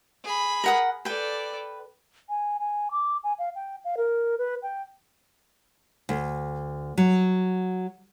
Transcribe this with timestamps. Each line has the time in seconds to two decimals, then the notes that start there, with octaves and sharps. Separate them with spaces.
0.24 G#4 B5
0.64 A#4 F#5 D#6
1.05 A4 B4 D5 G5
2.29 G#5
2.60 G#5
2.91 D6
3.24 G#5
3.39 F5
3.55 G5
3.85 F5
3.97 A#4
4.38 B4
4.63 G5
6.09 D2
6.98 F#3